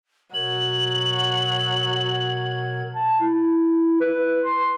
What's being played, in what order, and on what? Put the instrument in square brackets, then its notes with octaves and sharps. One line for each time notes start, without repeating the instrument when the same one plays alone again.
[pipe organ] B2 A#4 G#6 [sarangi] F#3 [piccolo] F#7
[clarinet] A5
E4
B4
C6